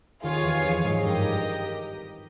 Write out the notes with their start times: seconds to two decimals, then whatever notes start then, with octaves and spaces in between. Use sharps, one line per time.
0.22 D#2 D#3 F4 G#4 C#5 F5 G#5
0.43 E2 E3
0.63 F2 F3
0.84 G#2 G#3
1.04 G2 G3 G4 A#4 D#5